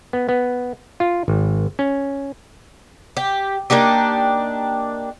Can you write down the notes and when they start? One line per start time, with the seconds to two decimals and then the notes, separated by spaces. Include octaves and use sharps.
0.13 B3
0.29 B3
1.00 F4
1.28 G#1
1.79 C#4
3.17 G4
3.70 A#3 D4 D#4 G4